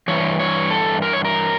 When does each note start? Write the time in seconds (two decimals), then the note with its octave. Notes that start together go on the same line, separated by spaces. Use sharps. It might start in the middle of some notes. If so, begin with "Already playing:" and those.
0.08 G2 E3 C#5
0.39 C#5
0.70 A4
1.02 A#4
1.13 C#5
1.25 A#4